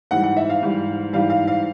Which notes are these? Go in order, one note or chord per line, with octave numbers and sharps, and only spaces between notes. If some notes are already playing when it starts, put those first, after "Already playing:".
G#2 E3 G3 F#5
F#5
E5
F5
G#2 E3 G3
G#2 E3 G3 F5
F5
F5